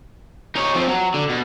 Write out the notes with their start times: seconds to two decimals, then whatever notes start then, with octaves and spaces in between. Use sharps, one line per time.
0.55 D#4 C#5
0.75 F3 C4
0.89 F#3
1.14 D3
1.29 B2